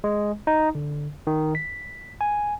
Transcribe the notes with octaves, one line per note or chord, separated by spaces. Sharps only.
G#3
D#4
D3
D#3
B6
G#5